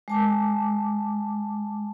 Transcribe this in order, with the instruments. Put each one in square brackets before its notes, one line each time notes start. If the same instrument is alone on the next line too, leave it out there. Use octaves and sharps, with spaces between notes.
[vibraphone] G#3 A5 D6